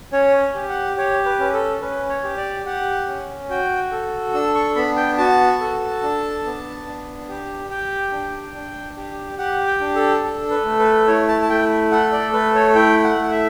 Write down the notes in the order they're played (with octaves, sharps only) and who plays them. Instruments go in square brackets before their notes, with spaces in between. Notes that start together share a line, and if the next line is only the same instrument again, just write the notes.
[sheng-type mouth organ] C#4 C#5
G4
F#5
G4 C#5
B4
C#4 B4
A4
C#4 B4
C#5
G4
D5
G4 F#5
C#4
F#4 G5
A4
D4 E6
C#6
B3 B5
G5
F#4 A5
A4
D4
B3
D4
G4
G4 G5
D4
D4
G4
G4 F#5
G5
D4
A4
A4
B4
A3
B4
E4 C#5
A5
A5
A3 G5
A4 F#5
D5
A3 B4
C#5
E4 G5
F#5
A3
F#5
E5